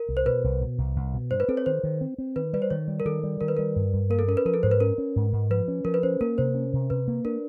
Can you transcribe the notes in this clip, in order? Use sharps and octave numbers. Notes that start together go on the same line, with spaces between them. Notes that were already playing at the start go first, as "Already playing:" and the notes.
Already playing: A#4
C2
C5
B2 B4
C2
B2
C2
C2
B2
G2 C5
B4
C4 A4
C#5
D#3 C5
D#3
C4
C4
D#3 B4
G3 B4
C5
D#3 C#5
G3
A#4
D#3 A4
G3
D#3 A#4
B4
G3 A#4
G2
G2
A#3 A#4
A4
C#4 A#4
B4
F3 A#4
A4
G#2 C5
B4
C#4 A#4
C#4
G#2
G#2
F3 B4
C#4
F3 A#4
B4
C#4 C5
A#3 A#4
C3 C5
C#4
C3
C3 B4
A#3
D4 A#4